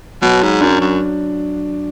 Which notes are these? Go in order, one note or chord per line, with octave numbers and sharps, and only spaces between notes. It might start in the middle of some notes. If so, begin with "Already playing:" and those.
B2 F#3
G#2
F#2 D4
F#2